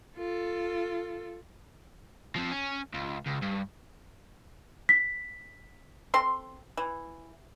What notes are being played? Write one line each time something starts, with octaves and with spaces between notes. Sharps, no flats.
F4 A4
F3 C4
C#4
C#2
C#2
G2
B6
C4 A4 C6
E3